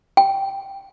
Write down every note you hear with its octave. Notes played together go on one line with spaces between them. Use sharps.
G5